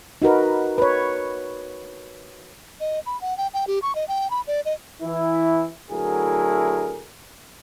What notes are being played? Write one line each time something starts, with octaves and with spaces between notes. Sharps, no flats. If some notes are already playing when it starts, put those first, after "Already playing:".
D#4 F#4 A#4 B4
B4 C#5
D#5
B5
F#5
G5
G5
G4
C#6
D#5
G5
B5
D5
D#5
E3 E4
D3 F#3 A3 E4 G#4 A#4